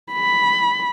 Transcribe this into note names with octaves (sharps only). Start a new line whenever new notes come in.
B5